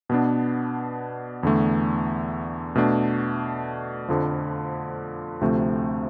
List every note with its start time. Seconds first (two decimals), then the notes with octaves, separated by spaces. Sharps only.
0.09 B2 B3 D4
1.43 E2 D3 A3
2.75 B2 A3 D4
4.09 F2 D3 F3
5.41 D2 C3 F3 A3 C4